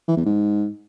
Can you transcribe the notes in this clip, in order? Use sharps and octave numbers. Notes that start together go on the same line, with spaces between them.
E3
E2
G#2